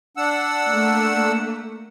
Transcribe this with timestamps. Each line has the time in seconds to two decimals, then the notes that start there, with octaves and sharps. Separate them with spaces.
0.17 D4 F#5 E6
0.68 A3 A#3